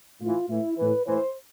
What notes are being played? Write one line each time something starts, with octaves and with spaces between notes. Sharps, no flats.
A2 E3 F4
A2 E3 E4
A2 E3 B4
A2 E3 C5